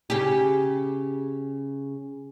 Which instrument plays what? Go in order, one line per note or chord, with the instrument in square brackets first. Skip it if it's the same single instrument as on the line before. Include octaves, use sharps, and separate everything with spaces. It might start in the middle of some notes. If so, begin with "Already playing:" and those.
[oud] C#3 G4